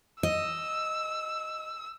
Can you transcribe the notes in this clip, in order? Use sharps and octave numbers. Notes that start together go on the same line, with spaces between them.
D#5 E6